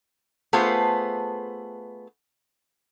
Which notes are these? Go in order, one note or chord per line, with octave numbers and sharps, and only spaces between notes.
A3 B3 F4 G#4 B4 C5